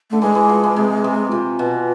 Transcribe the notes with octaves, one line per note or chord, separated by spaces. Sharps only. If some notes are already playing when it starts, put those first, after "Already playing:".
D3 A3
E3 G#3
E3
F3
E3
C3
C3
C3 F4
B2